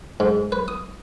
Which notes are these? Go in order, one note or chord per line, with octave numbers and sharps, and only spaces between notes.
G#2
B4
D#6